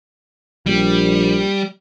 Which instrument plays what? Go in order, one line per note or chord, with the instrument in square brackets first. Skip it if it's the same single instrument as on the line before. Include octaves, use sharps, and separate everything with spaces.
[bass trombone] A#1 [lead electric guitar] G3